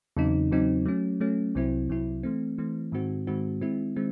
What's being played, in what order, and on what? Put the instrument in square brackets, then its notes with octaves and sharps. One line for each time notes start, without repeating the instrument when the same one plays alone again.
[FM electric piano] E2 C#3 F#3 C4 D#4
E2 C#3 F#3 C4 D#4
F#3 A3 C#4
F#3 A3 C#4
C2 C3 F#3 C4 E4
C2 C3 F#3 C4 E4
E3 A3 C4
E3 A3 C4
G#2 D#3 G#3 C4 F#4
G#2 D#3 G#3 C4 F#4
D#3 G#3 C4 E4
D#3 G#3 C4